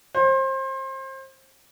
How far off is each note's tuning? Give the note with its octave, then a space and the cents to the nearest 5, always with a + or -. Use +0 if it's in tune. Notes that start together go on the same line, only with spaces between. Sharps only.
C5 +30